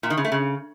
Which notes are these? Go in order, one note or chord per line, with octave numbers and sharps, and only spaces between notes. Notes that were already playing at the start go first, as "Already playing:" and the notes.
A#2
D#3
C#3
A3
C#3